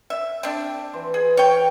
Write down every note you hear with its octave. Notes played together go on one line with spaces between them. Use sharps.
E5
C4 D4
E3 C5
G#4
C#5 G5